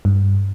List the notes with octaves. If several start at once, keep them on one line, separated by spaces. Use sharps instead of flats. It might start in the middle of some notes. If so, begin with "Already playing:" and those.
G2